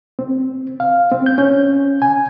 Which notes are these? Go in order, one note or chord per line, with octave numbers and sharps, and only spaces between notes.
C4
F5
C4
G6
C#4
G#5